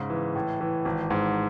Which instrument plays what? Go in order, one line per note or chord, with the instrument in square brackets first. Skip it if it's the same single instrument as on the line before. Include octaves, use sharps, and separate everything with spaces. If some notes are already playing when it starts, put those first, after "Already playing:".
Already playing: [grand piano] G#2 C#3
E3
A2
E3
G#1
G#2